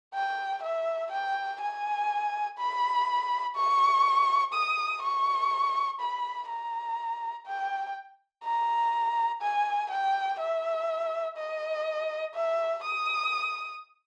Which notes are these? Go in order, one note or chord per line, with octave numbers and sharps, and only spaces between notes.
G5
E5
G5
G#5
B5
C#6
D#6
C#6
B5
A#5
G5
A#5
G#5
G5
E5
D#5
E5
D#6